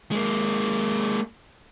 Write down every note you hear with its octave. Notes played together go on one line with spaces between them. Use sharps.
G#3 A#3